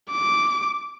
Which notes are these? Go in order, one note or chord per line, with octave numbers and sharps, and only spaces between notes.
D6